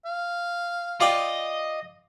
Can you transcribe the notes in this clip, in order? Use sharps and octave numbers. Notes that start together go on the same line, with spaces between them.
F5
F4 D5 D#5 G5